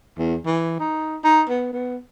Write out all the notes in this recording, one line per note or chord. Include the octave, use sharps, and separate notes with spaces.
E2
E3
D#4
D#4
B3
B3